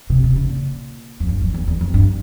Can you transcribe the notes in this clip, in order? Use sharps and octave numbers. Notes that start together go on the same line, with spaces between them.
C3
C3
C#3
A#2
F2
G2
F2
E2
E2
F2
G2